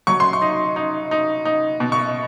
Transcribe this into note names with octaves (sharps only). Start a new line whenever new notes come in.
F#3 C#6
C6
C#6
D#4
D#4
D#4
D#4
B2
C#6